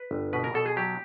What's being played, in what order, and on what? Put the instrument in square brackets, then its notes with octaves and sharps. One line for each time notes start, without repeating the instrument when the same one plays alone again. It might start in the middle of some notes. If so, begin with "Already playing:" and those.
Already playing: [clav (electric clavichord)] B4
G1
B2 B4
A#4
B2 A4
G#4
F#3 G4